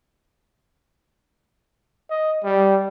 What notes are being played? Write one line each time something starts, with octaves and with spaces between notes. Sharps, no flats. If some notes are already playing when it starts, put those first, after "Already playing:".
D#5
G3